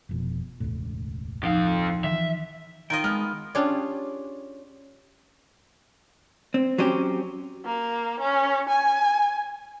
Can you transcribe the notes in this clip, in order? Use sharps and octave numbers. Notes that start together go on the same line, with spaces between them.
F1 F2 B2
E1 C#2 A2
F2 F3 D#4 F5
D#3 E3 E5
D#3 F4 D#5 G5
G#3 B3 F6
C#4 D4 F4 G4 G#4 D5
C4
F#3 C4 C#4 G4
A#3
C#4
G#5